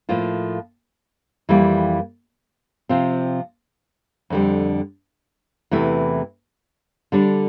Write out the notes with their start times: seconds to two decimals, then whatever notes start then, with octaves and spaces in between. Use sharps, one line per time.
0.09 A2 F3 A#3 F4
1.49 F2 E3 G3 A#3
2.89 C3 F3 C4 F4
4.30 F2 D3 G3
5.71 E2 C3 E3 A3 E4
7.12 D3 G3 D4